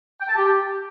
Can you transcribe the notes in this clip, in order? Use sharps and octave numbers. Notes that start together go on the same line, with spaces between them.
G5
A5
G4